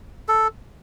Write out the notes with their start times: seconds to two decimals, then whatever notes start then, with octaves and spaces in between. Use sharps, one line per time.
0.28 A4